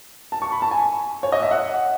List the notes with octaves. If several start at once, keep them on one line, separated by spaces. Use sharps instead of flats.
A5
C#6
B5
A5
G#5
C#5
D#5
E5
F#5